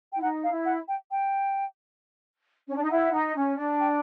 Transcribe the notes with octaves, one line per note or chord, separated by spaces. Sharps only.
E4 G5
D#4 F#5
F5
E4
F#5
G5
G5
C#4
D4
D#4
E4 F#5
D#4
C#4
D4
G5